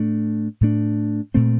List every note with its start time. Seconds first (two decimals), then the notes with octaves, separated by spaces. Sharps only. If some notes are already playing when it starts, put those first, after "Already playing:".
Already playing: A2 A3 D4
0.61 A2 A3 D4
1.34 A#2 A3 C4